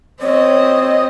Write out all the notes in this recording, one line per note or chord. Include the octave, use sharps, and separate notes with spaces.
C4 C#5 D#5